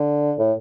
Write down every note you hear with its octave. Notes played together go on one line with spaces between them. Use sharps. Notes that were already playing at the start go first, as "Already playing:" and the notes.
Already playing: D3
A2